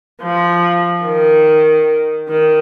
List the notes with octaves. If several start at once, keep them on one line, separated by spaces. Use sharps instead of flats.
F3
D#3
D#3